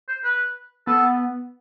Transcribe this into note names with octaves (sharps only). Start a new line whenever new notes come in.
C5
B4
B3 A4